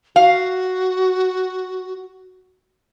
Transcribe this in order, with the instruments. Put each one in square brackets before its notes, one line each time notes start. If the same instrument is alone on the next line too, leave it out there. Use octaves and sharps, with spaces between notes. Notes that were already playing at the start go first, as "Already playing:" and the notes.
[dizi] F#4 [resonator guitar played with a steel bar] F5